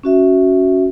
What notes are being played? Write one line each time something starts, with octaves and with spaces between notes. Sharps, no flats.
C#4 F#4 E5